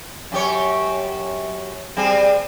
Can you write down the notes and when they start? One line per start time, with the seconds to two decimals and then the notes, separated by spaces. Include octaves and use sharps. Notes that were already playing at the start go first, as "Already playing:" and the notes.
0.32 F#2 G4 C#5
1.97 G3 C4 G#4